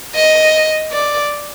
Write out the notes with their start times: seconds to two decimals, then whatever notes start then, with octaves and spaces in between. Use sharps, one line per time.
0.15 D#5
0.92 D5